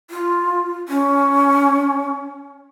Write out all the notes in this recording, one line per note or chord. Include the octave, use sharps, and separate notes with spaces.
F4
C#4